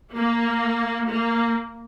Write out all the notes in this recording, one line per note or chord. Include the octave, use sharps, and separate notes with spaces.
A#3
A#3